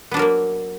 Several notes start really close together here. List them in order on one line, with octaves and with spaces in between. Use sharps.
B3 D4 F#3 A#4 A#3